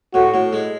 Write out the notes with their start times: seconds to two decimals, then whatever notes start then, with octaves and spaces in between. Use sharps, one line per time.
0.14 A2 F#4
0.34 A2
0.53 G#3